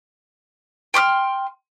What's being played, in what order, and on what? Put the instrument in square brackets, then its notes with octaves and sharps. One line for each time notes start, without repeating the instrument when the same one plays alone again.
[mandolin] G5 C6 D6 F6